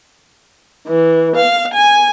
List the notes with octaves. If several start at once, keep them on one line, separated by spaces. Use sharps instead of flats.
E3
F5
G#5